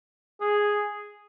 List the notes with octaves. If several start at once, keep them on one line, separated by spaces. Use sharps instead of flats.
G#4